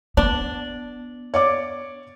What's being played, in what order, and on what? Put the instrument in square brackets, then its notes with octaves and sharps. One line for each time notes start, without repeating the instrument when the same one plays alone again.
[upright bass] B3 [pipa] D4
[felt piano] C#5 D5 D6